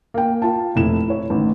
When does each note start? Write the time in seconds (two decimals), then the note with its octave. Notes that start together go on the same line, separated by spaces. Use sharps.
0.14 A#3 G5
0.42 F4 A5
0.76 F1 E4 E7
1.08 E4 C#5
1.30 A1 D#3